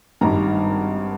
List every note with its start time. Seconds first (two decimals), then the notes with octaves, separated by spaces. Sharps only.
0.21 G#1 G2 D#3 A#5